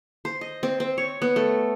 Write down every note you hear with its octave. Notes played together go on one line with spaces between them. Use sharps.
C5
D#5
C4
C4
C#5
B3
A3